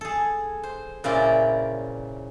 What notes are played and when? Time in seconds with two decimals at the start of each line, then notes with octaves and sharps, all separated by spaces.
0.01 G#4 A4
0.63 C5
1.04 A#2 C#3 C4 E4 D5